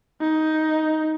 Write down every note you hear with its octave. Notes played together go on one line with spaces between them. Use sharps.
D#4